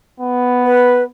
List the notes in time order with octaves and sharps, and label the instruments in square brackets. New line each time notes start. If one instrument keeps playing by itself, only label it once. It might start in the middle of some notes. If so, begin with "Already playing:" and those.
[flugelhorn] B3
[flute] B4